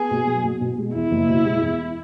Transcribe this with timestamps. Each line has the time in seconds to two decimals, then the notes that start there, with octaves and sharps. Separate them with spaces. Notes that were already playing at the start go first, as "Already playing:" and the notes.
Already playing: B3 G#4
0.11 B2
0.27 F#3
0.43 B2
0.61 B2
0.78 G#3
0.94 E2 E4
1.11 F#1
1.28 B2
1.45 G#3
1.62 E2